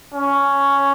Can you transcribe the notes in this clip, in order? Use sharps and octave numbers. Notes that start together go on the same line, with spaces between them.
C#4